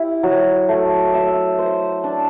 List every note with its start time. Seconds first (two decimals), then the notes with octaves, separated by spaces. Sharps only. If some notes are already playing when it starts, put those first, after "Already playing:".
Already playing: E4 G4
0.23 F#3
0.69 A3
1.14 E5
1.59 C5
2.04 D4